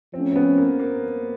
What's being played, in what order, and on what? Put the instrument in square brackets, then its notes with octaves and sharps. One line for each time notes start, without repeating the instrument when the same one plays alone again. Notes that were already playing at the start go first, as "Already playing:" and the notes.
[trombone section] F3 A3 C#4 [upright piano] C4
[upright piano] C4
B3
A#3
A#3